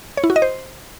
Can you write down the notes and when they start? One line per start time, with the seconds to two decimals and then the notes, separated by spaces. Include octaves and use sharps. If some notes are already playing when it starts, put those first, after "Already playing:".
0.17 C#5
0.24 E4
0.30 F#4
0.36 D#5
0.42 C5